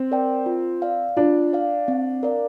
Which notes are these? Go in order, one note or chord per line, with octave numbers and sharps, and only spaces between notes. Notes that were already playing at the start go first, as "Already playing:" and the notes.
Already playing: C4
A#4 D5 G5
F4
D5 F5
D4 F4
D5 F5
C4
A#4 D5 F5